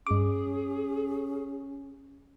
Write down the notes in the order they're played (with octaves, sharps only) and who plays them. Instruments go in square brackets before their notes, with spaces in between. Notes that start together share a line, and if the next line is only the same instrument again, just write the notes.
[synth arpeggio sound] G2 D6 [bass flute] C#4 [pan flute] G#4